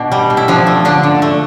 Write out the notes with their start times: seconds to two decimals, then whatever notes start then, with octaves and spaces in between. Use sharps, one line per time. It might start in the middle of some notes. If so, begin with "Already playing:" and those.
Already playing: B2 D4
0.12 G3
0.30 B2
0.37 E4
0.48 F3 D4
0.67 A3
0.85 D3 D4
1.03 D3
1.22 A3